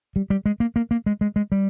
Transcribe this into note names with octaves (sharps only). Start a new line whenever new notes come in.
G3
G3
G#3
A#3
A#3
A#3
G#3
G#3
G#3
G3